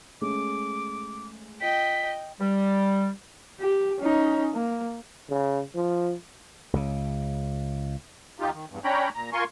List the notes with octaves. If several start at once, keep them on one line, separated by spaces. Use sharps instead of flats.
G#3 A3 C#4 D6
F4 D#5 G5 B6
G3
G4
C#4 D#4
A#3
C#3
F3
C#2 C#3
D#2 D#4 F4 G4
D#3
E2 G2
C#4 D4 C#5 G5 A#5 B5
A#2 A#5
F4 A#4 G#5 C6 C#6